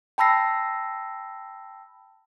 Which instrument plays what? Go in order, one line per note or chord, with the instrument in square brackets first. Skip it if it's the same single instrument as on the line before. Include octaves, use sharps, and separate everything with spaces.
[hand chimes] G5 A5 B5 E6 A#6 C7